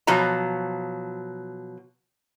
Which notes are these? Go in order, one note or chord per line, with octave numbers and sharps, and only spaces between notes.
B2 F3 F#3 A#5